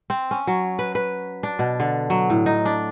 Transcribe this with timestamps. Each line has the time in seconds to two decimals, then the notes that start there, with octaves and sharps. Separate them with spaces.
0.10 C4
0.31 C#4
0.47 F#3
0.79 B4
0.95 B4
1.43 D4
1.59 B2
1.80 D3
2.10 F#3
2.30 A2
2.46 D#4
2.65 D4